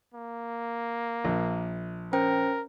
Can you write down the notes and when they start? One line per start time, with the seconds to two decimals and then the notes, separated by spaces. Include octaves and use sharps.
0.14 A#3
1.25 A#1
2.13 C#4 A#4 C5 G5